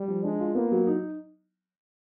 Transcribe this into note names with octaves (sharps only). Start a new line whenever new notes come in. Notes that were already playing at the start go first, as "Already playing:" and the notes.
Already playing: G3
F3
G#3 D4
F4
A#3 B3
F#3
D#4